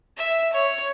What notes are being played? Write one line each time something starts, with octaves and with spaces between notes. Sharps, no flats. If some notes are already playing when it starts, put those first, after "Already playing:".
E5
C#5